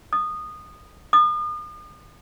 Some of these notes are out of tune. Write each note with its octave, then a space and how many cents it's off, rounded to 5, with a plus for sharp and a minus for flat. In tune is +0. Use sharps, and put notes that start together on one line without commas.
D#6 -20
D#6 -40